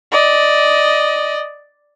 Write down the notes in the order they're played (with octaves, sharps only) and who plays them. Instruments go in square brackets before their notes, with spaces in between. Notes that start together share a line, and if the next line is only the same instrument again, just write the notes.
[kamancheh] D5 D#5